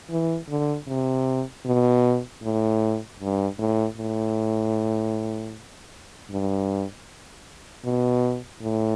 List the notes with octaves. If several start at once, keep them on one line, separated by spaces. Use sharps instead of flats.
E3
D3
C3
B2
A2
G2
A2
A2
G2
B2
A2